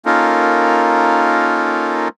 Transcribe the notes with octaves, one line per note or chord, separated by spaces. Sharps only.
A#3 C#4 D#4 F4 A4 A#4